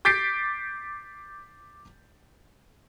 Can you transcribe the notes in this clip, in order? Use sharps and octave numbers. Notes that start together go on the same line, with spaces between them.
D6 G6 A6 B6 C7 D7